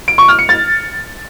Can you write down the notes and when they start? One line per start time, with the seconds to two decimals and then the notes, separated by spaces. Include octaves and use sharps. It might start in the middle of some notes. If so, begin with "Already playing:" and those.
0.08 D7
0.18 C#6
0.28 F6
0.39 C#7
0.49 A6